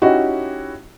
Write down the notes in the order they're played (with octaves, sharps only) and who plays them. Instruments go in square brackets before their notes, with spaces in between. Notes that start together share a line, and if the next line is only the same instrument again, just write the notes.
[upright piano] C#4 D#4 E4 F#4 G4